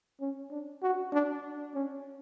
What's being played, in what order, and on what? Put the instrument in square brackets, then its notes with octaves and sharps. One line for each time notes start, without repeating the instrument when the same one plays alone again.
[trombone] C#4
D4
F#4
D4
C#4